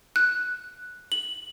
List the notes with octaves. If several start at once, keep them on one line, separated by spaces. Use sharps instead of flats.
F#6
F#7